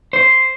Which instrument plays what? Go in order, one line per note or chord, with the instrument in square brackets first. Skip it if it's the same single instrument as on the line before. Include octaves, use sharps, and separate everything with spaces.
[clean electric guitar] C5